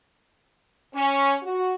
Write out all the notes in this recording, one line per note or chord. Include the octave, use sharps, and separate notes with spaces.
C#4
F#4